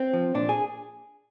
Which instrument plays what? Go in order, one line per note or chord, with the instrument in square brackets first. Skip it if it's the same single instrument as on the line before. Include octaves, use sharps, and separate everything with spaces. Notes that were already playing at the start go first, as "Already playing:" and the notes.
Already playing: [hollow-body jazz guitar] C4
F3
A#2 D4
G#4